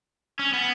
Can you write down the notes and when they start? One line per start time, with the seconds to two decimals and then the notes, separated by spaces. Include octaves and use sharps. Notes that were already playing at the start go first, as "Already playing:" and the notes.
0.39 C#4
0.53 B3